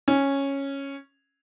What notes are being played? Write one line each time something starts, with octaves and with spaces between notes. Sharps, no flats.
C#4